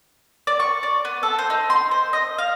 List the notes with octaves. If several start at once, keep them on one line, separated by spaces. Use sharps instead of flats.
D5
C#6
D5
B3
A4
C5
D#4
C6
C5
D#5
F5